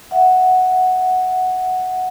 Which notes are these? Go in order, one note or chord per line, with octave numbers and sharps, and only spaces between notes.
E5 F#5